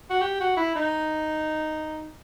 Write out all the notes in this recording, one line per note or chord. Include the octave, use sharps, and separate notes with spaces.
F#4
G4
F#4
E4
D#4